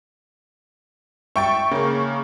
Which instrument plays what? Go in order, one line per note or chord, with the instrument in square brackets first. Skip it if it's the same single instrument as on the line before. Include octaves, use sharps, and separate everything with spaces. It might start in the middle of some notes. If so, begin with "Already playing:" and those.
[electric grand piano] E5 G5 A6 [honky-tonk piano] C#6
[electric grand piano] C#3 A#3